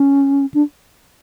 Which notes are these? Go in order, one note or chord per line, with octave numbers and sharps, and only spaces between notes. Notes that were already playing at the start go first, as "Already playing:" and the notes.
Already playing: C#4
D4